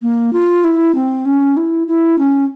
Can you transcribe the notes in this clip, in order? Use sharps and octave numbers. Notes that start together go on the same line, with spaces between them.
A#3
F4
E4
C4
C#4
E4
E4
C#4